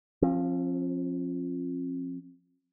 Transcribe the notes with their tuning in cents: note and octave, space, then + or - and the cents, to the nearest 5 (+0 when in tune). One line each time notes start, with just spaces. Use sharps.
F3 +0 C4 +45